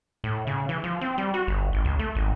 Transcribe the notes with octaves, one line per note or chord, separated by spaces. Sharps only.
A2
C#3
E3
F3
C4
G3
F#4
G1
G#1
C#2
A3
G#1